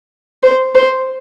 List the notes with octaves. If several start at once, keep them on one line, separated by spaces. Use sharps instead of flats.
C5
C5